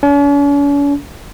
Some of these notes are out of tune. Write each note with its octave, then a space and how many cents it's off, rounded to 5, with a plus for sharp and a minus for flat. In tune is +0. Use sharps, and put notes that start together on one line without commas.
C#4 +45